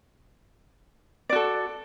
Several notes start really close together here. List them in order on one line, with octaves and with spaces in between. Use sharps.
D5 F#4 A4